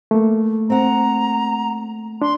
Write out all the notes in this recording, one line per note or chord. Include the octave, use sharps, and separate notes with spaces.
A3 A#3
C4 F#5 A#5
D4 C6